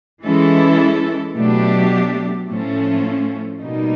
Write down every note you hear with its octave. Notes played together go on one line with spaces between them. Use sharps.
E3 G#3 C#4 E4 A4
B2 F#3 A3 D4 G4
A2 F3 A3 C#4
B2 G3 A#3 D#4